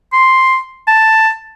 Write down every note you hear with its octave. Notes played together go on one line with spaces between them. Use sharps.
C6
A5